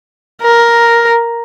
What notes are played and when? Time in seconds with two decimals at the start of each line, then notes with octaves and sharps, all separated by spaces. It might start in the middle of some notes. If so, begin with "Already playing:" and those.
0.42 A#4